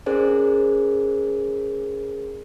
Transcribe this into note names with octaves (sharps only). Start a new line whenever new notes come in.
C#4 G#4 A#4 C5 D5